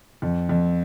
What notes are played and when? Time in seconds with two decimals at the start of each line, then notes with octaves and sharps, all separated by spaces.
0.22 F2
0.49 F2